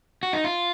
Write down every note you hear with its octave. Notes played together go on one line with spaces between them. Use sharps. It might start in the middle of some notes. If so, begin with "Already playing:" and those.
F#4
D#4
F4